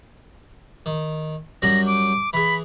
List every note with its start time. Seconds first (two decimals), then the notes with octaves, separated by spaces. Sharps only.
0.86 D#3
1.62 F#2 F#3 G3 A#6
1.87 D6
2.33 E3 G#4 B5